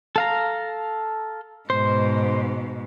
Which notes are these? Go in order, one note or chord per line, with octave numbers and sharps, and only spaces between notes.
A4 F5 A#5
G#2 B2 C5